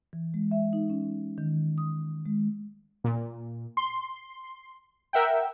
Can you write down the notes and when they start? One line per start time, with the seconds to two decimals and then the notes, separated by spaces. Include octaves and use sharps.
0.13 E3
0.34 G#3
0.51 E5
0.73 D#4
0.90 C#4
1.38 D#3
1.78 D#6
2.26 G#3
3.04 A#2
3.77 C6
5.13 A#4 E5 F#5 G5